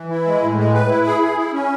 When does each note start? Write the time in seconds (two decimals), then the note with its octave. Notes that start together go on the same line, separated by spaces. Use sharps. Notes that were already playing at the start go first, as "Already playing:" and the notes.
Already playing: E3
0.11 E4
0.26 G#3
0.42 A2
0.57 G#3
0.74 B4
0.89 E4
1.06 G#4
1.22 G#4
1.37 E4
1.53 C#4